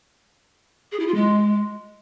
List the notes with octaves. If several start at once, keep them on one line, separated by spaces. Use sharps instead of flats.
G#4
E4
F4
G#3